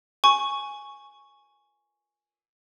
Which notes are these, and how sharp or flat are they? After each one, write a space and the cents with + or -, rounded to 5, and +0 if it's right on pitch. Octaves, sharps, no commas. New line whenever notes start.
G#5 +0 C#6 -5